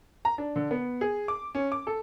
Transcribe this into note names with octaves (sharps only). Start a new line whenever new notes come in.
A#5
D4
D3
B3
G#4
D6
C#4
D6
A4